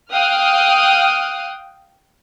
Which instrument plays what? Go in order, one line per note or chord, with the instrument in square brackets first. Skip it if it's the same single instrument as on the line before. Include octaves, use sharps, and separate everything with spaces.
[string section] F5 G5 D#6 F6 F#6